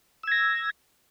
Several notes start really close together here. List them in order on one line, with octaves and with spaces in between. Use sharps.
E6 G#6 A#6